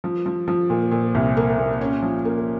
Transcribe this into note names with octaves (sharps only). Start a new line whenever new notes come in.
F3
F3
F3
A#2
A#2
C2
A#3
A#2
C#4
F3
A#3